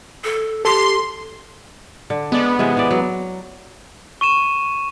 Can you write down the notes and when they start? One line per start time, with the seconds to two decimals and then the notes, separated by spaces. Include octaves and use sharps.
0.24 A4
0.65 G4 A4 C6
2.10 D3
2.32 G#3 B3 D5
2.59 C3 E3 G#3
2.75 C3 E3 D5
2.91 F#3
4.21 C#6 D#7 E7